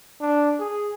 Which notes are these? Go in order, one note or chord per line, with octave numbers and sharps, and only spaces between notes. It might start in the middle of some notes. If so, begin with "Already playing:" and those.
D4
G#4